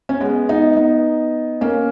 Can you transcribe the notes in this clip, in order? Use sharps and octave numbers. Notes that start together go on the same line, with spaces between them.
C#4
G#3 B3
B3 D#4
B3 D#4
A#3 C#4